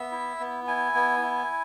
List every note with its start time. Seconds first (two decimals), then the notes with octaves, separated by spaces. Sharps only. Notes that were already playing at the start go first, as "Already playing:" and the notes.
Already playing: B3 E5
0.12 E4
0.40 B3
0.67 E4 G#5
0.94 B3
1.22 E4